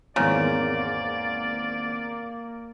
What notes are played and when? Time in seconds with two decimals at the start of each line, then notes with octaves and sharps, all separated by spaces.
0.16 G#1 E2 C#3 A#3 D5 A#5